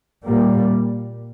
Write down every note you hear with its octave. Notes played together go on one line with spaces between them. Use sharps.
A#2 G3 A#3